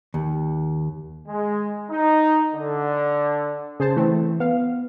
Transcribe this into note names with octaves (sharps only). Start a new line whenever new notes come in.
D#2
G#3
D#4
D3
C#3 G#4 C5 A5
E3 A3 C4
B3 F5